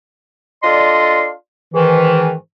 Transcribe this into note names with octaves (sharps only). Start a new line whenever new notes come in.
D4 F4 A4 D5 D#5 C6
G#2 D#3 E3